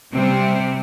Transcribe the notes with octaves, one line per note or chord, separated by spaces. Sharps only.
C3 G3 C4